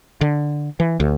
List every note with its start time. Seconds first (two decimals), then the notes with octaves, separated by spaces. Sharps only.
0.21 D3
0.80 E3
1.00 D2